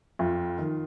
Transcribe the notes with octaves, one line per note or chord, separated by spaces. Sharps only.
F2 F4
D#3